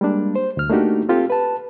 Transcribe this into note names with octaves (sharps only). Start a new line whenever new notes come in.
G3 G#3 A#3 D4
C5
D2 F6
A3 A#3 D4 D#4 F#4 G4
C4 F4 G4 A4
B4 A5